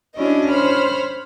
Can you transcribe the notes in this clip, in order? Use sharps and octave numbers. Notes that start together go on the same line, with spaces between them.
C#4 D4 E4 F#4 D5 D#5
C5 C#5 B5 F6